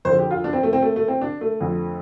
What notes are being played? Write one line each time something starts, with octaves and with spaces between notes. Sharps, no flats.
F2 D3 C5
G4
F4
D4
C4
A3
C4
A3
A3
C4
D4
A3
F2 D3